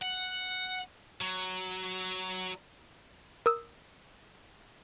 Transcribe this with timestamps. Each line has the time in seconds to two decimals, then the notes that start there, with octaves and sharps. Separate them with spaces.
0.02 F#5
1.21 F#3
3.46 A#4 D#6 E6